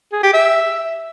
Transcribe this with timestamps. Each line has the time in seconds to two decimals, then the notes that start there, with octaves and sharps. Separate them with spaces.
0.13 G#4
0.23 G4
0.33 E5